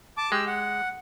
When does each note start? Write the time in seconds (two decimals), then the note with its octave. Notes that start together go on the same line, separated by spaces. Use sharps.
0.17 A5 D6
0.32 G#3 G4 E6
0.47 F#5